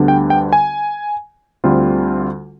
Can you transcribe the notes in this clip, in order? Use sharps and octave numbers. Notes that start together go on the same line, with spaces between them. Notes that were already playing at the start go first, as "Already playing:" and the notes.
Already playing: D2 D3 G3 B3 D4
G5
G5
G#5
D2 D3 G3 C4 F4